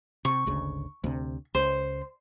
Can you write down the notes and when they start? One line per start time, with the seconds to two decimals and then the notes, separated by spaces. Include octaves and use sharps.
0.25 C3 C#6
0.46 G#1 D2 C#3
1.04 D2 C3
1.55 C#2 C5